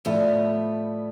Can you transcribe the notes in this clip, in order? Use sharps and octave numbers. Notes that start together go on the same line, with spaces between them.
A2 F3 G3 A3 B3 E4 A4